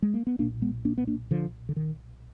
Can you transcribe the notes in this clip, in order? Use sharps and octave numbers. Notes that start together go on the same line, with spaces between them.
G#3
A#3
B3
B1 A#2 A#3 D4
G#3 B3
A#3 D4
B3
A#3 D4
D3 F3
D3
D#3